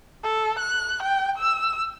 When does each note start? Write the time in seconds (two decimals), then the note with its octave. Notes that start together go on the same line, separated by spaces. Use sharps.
0.23 A4
0.59 F#6
1.02 G5
1.38 E6